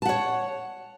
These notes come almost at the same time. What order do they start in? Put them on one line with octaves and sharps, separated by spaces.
A5 F#5 C#5